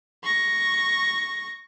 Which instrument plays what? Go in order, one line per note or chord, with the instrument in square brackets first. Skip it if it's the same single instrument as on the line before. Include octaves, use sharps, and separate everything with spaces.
[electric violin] C#6 A#6